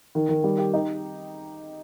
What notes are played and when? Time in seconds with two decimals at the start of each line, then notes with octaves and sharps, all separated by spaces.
0.15 D#3
0.29 D#3
0.44 G3
0.58 G4
0.74 D#4